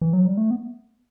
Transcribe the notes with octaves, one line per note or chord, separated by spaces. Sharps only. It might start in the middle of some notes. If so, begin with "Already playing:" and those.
E3
F#3
G3
A3
B3